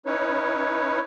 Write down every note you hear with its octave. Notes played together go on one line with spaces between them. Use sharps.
C#4 D#4 E4 B4 C#5